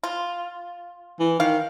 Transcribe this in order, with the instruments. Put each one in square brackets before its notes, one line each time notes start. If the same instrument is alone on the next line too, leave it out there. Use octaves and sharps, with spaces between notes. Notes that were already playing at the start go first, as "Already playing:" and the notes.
[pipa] F4
[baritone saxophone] E3
[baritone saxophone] D#3 [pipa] F5